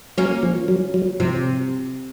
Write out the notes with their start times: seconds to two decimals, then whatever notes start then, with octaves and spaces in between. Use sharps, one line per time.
0.18 F#3 A#3 C#4
0.43 F3
0.68 F#3
0.94 F#3
1.20 C3 F3